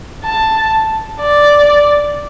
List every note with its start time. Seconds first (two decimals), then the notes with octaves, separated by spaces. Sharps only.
0.24 A5
1.20 D5